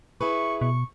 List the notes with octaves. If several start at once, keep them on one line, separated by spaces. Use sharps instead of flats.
E4 G#4 B4 C#6
B2 C#6